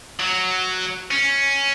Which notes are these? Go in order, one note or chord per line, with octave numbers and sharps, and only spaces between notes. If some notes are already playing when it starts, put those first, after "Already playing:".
F#3
C#4